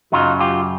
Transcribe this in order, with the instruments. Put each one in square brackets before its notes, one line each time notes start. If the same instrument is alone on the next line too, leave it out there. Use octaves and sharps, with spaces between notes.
[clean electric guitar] F#2 C#3 F#3 D#4 F4
F4 G4